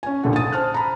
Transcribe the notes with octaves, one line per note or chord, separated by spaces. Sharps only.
C#4 G#5
A#1 D#2 A#2 D3 A4 F#5
D#6 A6 D#7
C5 A5 F6 F#6
A#5 B5